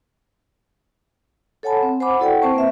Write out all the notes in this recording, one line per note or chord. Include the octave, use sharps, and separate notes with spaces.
A4 C#5 F#5 G#5 A5 B5
C4
C5 F#5 G#5 B5 D6
E4 F#4 A4 D5 F#5 G5
C4 C5 A5 C#6
A#3 B4 E5